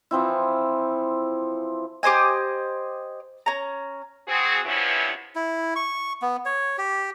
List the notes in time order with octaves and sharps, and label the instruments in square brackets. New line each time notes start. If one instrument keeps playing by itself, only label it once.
[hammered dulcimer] E3 F3 C4 E4
[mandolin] G4 C5 D#5 G#5
C#4 A#5
[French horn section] C4 F#4 G#4
G2 C3 F3 B3 C#4 E4
[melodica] E4
C#6
B3
C#5
G4